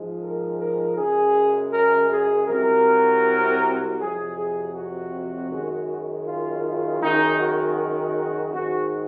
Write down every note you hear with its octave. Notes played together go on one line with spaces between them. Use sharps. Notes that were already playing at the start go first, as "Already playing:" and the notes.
Already playing: G#2 F3 G#3
A#4
A#4
F#2 C#3 G#3 G#4
A#4
G#4
C2 C3 F#3 A#4
F2 C3 F#3 G#4
G#4
F#4
F#2 D#3 G#3
F4
F4
F#2 D#3 G#3 D#4
F#4
F#4
G#2 D#3 G#3 F#4